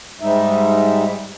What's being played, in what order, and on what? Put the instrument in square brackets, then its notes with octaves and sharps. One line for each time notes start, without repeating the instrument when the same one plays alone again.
[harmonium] G#2 G3 G#3 D#4 E5